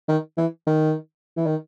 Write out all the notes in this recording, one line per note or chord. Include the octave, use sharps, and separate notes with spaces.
D#3
E3
D#3
E3
D#3